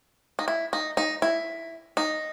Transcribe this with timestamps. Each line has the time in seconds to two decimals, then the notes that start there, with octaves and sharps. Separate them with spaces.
0.39 D#4
0.48 E4
0.73 D#4
0.97 D#4
1.22 E4
1.97 D#4